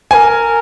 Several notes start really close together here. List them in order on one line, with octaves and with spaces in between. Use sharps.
C5 G#5 A#4